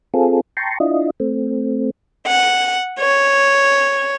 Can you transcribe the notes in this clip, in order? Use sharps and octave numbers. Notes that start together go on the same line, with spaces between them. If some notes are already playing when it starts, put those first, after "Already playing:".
C4 F4 G#4 A4
G5 A5 A#5 C6 C#6
D4 E4 F4 D#5
A3 C4
F#5
C#5